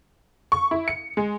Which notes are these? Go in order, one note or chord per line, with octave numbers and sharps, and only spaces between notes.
C#6
E4
C#7
G#3